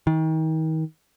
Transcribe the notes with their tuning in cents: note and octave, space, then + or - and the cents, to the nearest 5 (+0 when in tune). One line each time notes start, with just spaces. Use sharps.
D#3 +35